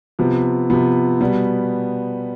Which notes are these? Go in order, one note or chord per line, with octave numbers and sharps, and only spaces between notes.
C3 F3 B3
C3 F3 B3
B2 G3 B3